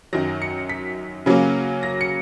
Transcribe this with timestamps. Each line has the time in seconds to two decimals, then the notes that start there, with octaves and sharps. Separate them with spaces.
0.13 F#2 D#3 F#3 A#6
0.42 C#7
0.69 B6
1.26 C#3 F#3 A#3 C#4
1.83 A#6
2.01 C#7